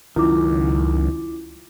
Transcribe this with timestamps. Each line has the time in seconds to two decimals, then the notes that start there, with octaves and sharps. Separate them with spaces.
0.16 C#2 F#2 D#3 E4 F4 D6